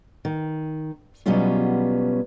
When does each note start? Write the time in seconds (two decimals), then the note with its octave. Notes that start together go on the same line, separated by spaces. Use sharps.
0.25 D#3
1.26 B2 F#3 G3 B3 C#4 F4